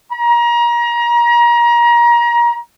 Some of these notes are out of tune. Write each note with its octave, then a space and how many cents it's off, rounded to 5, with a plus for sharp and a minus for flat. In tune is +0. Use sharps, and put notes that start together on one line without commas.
A#5 +30